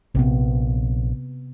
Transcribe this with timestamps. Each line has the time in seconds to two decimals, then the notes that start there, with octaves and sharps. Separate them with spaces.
0.15 A#1 C3 B3